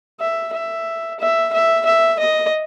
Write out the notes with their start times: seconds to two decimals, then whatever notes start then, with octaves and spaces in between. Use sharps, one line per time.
0.20 E5
0.53 E5
1.20 E5
1.53 E5
1.86 E5
2.19 D#5